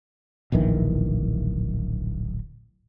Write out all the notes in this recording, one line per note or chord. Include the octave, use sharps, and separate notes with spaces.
D1 A#1 D#3 E3